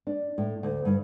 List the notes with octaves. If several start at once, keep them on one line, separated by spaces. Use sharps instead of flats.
D4
A2
D2
G2